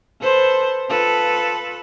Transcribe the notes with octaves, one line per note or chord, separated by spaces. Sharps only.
A4 B4 C5
F4 A4 B4